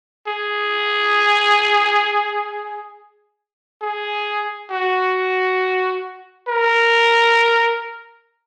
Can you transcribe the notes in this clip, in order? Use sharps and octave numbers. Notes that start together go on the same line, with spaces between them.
G#4
G#4
F#4
A#4